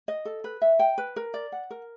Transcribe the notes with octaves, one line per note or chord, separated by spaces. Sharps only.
D#5
A4
B4
E5
G5
B4
A#4
D5
F#5
A#4